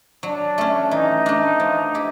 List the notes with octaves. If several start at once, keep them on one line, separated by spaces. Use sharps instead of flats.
F#3 D4
A3 C#4
E3 D#4
A3 D4
F3
E4 G4